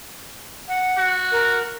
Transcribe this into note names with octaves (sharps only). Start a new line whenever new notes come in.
F#5
F#4
A#4